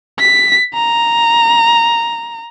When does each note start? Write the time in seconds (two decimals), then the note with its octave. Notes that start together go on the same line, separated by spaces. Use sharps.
0.19 B6
0.74 A#5